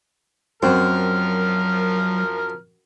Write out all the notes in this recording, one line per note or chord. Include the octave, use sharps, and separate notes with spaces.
F#2 F3 F#3 C4 A#4 F6